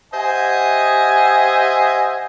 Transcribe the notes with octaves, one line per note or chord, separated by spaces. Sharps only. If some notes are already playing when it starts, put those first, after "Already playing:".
G4 C5 D#5 E5 F#5 G#5